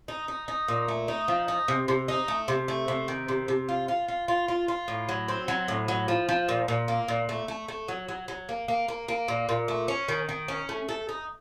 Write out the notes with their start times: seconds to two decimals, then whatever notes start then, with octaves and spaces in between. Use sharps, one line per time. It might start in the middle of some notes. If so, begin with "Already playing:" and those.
0.08 D#4
0.28 D#4
0.48 D#4
0.68 A#2
0.88 A3
1.08 D#4
1.28 F3
1.48 D#4
1.68 C3
1.88 C3
2.08 D#4
2.28 A3
2.48 C3
2.68 A3
2.88 C3
3.08 D#3
3.28 C3
3.48 C3
3.69 F4
3.88 F4
4.08 F4
4.28 F4
4.48 F4
4.68 F4
4.88 A2
5.09 F#3
5.28 C4
5.48 F#3
5.68 A2
5.88 F#3
6.08 F3
6.29 F3
6.49 A#2
6.68 A#2
6.88 A#3
7.08 A#2
7.29 A3
7.48 A3
7.68 A3
7.88 F#3
8.08 F#3
8.28 F#3
8.49 A#3
8.68 A#3
8.88 A#3
9.08 A#3
9.28 A#2
9.49 A#2
9.68 A3
9.88 C#4
10.08 D#3
10.29 D#3
10.48 C#4
10.69 A3
10.89 A4
11.09 D#4